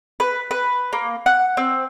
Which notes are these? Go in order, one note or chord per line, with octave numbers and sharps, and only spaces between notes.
B4
B4
A#3
F#5
C4